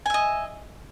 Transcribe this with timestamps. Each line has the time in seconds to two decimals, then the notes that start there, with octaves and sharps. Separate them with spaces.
0.06 G#5
0.10 E5
0.14 D#5